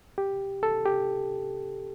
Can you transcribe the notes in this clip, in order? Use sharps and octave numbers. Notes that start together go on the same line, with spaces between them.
G4
A4
G4